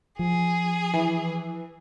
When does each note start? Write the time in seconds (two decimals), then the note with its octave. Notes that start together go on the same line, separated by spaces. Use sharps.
0.19 F3 G#4
0.94 E3